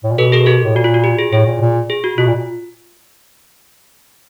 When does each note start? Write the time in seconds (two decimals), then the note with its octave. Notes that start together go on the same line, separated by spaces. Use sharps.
0.04 A2
0.11 A#2
0.18 B2 A4 B4
0.32 G#4 A#4
0.46 G4 A4
0.64 A2
0.75 A#2 F#4
0.84 F4
0.94 F#4
1.04 G4
1.19 G#4
1.32 A2 G#4
1.47 A#2
1.61 A#2
1.90 G#4
2.04 F#4
2.18 B2 F4
2.28 A#2